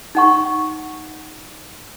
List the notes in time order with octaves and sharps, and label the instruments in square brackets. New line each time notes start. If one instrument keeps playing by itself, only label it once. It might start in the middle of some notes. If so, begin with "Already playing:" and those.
[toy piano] D#4 F#5 C#6